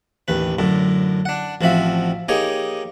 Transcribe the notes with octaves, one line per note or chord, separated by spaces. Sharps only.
A1 D#2 B4
F#2 A2 D3
D4 F#5
A1 F3 C4 F#4 E5 F5
A#3 D#4 G4 G#4 C#5